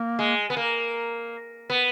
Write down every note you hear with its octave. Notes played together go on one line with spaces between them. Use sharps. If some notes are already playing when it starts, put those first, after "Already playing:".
Already playing: A#3
G#3
B3
A#3
B3